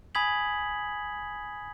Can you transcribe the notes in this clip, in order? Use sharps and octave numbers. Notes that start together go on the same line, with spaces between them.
G#5 B5 D#6 G#6 B6 F#7